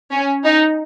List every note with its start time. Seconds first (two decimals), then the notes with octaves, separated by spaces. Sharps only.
0.11 C#4
0.45 D#4